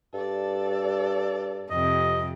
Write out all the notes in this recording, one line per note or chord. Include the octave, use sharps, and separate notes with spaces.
G2 A4 D5
F2 C3 D#5